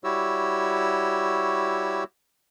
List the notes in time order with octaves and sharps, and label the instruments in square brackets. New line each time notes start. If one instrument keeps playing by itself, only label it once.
[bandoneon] G3 E4 F#4 G4 C#5 E6